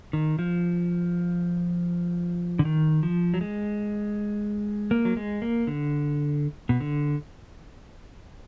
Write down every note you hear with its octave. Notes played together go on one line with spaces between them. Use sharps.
D#3
F3
D3
D#3
F3
F#3
G#3
A#3
F#3
G#3
A#3
D3
B2
D3